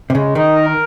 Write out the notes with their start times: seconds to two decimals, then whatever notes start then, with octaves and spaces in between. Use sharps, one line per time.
0.10 C3
0.15 C#3 G#3
0.35 D#3 D#4
0.55 A#4